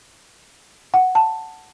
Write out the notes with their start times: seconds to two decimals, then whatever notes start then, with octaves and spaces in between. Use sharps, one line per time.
0.94 F#5
1.15 A5